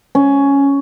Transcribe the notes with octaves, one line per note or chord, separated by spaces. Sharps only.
C#4